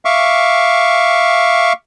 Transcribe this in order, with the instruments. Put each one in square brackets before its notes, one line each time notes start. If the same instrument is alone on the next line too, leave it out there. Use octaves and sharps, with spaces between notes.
[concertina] E5 F5 C#6 D6